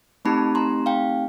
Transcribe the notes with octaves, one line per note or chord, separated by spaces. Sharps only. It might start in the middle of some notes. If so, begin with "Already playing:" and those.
A3 C4 D#4 G4 A5 B5
A#5 C6
F5 G5